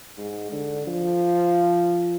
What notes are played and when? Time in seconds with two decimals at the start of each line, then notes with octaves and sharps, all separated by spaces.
0.18 G#2
0.52 D3
0.87 F3